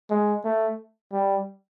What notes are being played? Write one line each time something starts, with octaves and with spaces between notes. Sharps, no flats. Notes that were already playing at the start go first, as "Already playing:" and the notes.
G#3
A3
G3